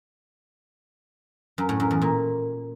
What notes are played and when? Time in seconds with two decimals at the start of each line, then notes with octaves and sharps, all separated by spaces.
1.58 F#2
1.69 A2
1.80 F#2
1.91 E2
2.02 A#2